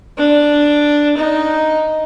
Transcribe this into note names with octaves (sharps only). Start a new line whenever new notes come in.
D4
D#4